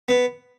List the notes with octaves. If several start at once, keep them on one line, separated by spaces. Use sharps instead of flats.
B3